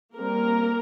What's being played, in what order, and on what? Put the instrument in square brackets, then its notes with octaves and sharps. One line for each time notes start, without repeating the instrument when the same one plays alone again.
[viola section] G3 A#3 C4 A#4